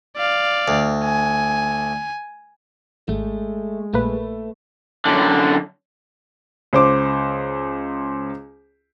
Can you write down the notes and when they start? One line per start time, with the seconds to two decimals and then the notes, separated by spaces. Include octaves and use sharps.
0.17 D5 F5
0.68 D2
1.04 G#5
3.09 G#1 G#3 A3
3.94 A#1 A3 A#3 B4
5.05 F#2 D3
6.73 C#2 C5 D6